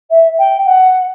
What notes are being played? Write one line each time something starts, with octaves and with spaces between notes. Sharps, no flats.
E5
G5
F#5